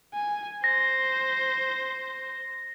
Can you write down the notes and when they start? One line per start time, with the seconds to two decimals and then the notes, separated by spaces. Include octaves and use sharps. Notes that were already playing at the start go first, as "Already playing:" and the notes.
0.14 G#5
0.64 C5 A#6